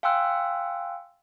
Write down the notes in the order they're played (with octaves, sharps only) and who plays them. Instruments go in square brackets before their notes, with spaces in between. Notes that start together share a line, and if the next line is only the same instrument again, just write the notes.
[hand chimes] F5 G5 G#5 C6 E6 F#6